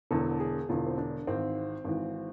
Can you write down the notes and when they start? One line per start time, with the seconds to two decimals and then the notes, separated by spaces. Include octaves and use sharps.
0.11 E1 E2 D3 A4
0.40 G#4
0.69 E1 E2 D3 F4
0.87 C4
0.98 D4
1.27 G#1 G#2 E3 C4
1.84 G#1 G#2 E3